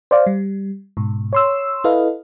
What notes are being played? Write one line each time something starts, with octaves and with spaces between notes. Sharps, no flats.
C5 D5 F5
G3
G#2 B2
C#5 C6 E6
E4 A4 B4 D#5 F5